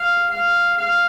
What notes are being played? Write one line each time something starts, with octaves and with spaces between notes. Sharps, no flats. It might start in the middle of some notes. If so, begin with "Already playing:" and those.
Already playing: F5
F5
F5